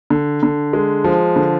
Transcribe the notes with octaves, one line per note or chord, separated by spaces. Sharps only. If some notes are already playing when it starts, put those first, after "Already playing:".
D3
D3
G#3
F3
D3